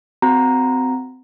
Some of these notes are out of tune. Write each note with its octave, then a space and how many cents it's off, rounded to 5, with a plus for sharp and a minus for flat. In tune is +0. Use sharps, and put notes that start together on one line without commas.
C4 -30 F#4 +0 A#5 +0